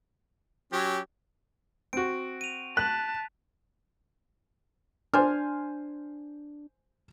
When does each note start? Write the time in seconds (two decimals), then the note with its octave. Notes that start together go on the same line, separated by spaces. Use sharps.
0.72 F#3 C#4 G4
1.93 C4 F#4 D7
2.41 D#7 F7
2.77 A5 F#6 B6
5.14 D4 C5 G#5 F6